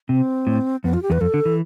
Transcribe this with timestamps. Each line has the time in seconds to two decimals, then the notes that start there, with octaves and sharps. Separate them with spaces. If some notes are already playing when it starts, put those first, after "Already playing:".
0.09 C3 C4
0.47 A2
0.84 F2 B3
0.93 F4
1.03 G4
1.10 E2 B4
1.21 F2 A4
1.34 D3
1.45 E3